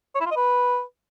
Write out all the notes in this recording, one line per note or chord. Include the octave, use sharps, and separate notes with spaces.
C#5
E4
F4
D#5
B4